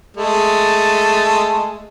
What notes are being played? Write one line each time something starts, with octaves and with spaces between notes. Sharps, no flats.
G#3 A3